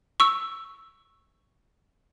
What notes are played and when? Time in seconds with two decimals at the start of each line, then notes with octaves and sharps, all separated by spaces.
0.20 C#6 E6